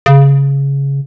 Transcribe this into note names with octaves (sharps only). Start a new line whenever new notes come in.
C#3